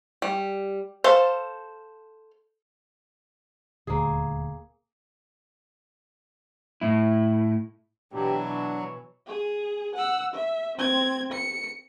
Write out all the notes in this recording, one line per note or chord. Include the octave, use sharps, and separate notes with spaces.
G3
A4 C5 F5
D#1 D2 A#3 G#4
A2 E4
B2 E3 F#3 D4 G4
D4 C#5
G#4
F#5 E6
E5
C4 G#6
C#7